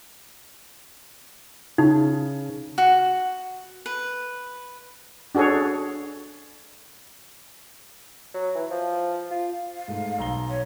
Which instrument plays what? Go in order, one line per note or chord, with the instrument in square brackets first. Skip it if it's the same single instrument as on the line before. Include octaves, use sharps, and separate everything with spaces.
[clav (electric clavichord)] C#3 [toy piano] D#4
[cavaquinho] F#4
B4
[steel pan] D4 F#4 G#4 A4 C#5
[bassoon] F#3
E3
F3
F4
[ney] F5
[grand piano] G#2 A3
B1 A#5 G7
[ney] C#5